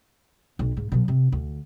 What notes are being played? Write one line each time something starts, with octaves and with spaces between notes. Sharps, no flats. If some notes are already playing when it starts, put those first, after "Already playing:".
B1
G#2
B2 F#3
C3
D2